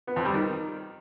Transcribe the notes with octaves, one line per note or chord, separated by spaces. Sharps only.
B3
F2
G3
D#3